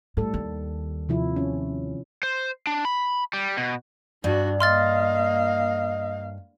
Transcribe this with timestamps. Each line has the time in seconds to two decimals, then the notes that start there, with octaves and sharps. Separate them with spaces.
0.17 A2 G3 A4
0.34 D#2
1.09 C3 F3 E4
1.36 C#4
2.23 C5
2.67 D4
2.85 B5
3.33 G3
3.58 B2
4.24 G2 D4 F#4
4.60 A#3 D#5 F5 C6 F6 A6